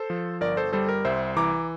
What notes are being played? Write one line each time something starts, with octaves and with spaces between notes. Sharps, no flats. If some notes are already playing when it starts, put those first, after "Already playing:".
Already playing: A4 C5
F3
G1 A#4 D5
A4 C5
G3 A4 C5
A#4
C2 C5 E5
E3 A#5 D6